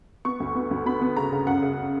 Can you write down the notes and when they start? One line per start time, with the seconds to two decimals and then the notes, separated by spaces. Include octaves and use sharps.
0.25 B3 C#6
0.40 D2
0.55 B3
0.71 D2
0.86 B3 B5
1.02 B3
1.17 C#3 A#5
1.32 C#3
1.47 F#2 F#5
1.62 C#3